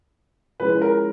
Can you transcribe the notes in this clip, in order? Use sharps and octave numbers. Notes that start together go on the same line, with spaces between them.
F3 G#3 C#4 E4 B4
A#4